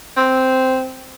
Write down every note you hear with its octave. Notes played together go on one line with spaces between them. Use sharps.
C4